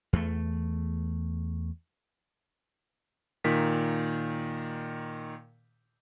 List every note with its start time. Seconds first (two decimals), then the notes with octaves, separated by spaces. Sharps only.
0.13 E2 A3
3.44 A#2 D#3 B6